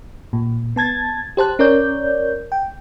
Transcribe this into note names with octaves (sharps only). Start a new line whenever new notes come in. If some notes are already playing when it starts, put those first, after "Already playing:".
A#2
B3 A5 G#6 A6
G4 C5 A5 F#6
C#4 A#4 C#5 D5 G6
G5